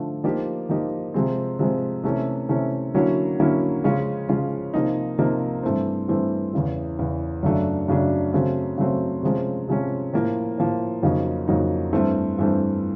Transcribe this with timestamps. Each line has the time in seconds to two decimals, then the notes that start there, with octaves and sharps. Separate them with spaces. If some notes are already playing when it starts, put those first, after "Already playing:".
Already playing: D3 F3 A3
0.24 F3 A#3 D#4 G4
0.69 F3 A#3 D#4 G4
1.14 C3 F3 G#3 C4
1.59 C3 F3 G#3 C4
2.04 C3 E3 A3 C#4
2.49 C3 E3 A3 C#4
2.94 D3 F#3 A#3 C#4 E4
3.39 D3 F#3 A#3 C#4 E4
3.84 C#3 F3 G#3 C#4 F4
4.29 C#3 F3 G#3 C#4 F4
4.74 C3 F3 A#3 D#4
5.19 C3 F3 A#3 D#4
5.63 G2 E3 A3 C4
6.08 G2 E3 A3 C4
6.53 E2 C#3 E3
6.99 E2 C#3 E3
7.43 F#2 C#3 F#3 A3 D4
7.88 F#2 C#3 F#3 A3 D4
8.33 C#3 F#3 A3 C4
8.78 C#3 F#3 A3 C4
9.23 C3 F3 G#3 C#4
9.68 C3 F3 G#3 C#4
10.13 A2 F3 A#3
10.58 A2 F3 A#3
11.03 F2 C#3 F#3 A#3 D#4
11.48 F2 C#3 F#3 A#3 D#4
11.93 G2 E3 A3 C4
12.39 G2 E3 A3 C4